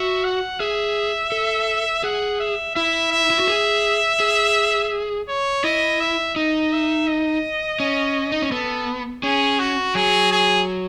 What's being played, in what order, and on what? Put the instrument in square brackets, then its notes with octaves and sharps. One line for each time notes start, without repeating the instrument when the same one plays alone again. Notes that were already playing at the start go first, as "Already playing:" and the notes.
Already playing: [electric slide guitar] F#4 [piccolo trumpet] E5
[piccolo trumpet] F#5
[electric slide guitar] G#4 [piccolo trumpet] E5
[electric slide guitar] A4
[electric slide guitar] G#4 [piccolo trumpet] F#5
[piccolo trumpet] E5
[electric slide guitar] E4 [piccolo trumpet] E5
[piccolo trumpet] E5
[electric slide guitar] E4
F#4
G#4
G#4
[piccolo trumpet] C#5
[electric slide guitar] E4 [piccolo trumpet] D#5
[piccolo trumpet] E5
[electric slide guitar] D#4 [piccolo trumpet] D#5
[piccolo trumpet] E5
D#5
[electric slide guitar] C#4
D#4
C#4
[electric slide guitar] B3 [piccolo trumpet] A4
[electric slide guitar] C#4 [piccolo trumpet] G#4
[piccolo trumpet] F#4
[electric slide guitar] F#3 [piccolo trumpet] G#4
[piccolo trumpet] G#4